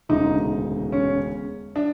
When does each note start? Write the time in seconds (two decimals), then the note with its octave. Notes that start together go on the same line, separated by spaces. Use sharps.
0.09 E1 D2 C#3 D#4
0.92 C#4
1.76 D4